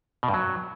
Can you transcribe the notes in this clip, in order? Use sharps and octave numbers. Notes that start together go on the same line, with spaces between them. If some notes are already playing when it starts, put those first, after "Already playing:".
B2
G2
F#3